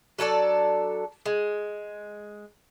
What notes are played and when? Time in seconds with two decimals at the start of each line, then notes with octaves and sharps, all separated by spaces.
0.19 F#3 D4 A4 D5
1.26 G#3